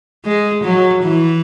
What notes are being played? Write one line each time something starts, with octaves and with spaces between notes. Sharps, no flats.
G#3
F#3
E3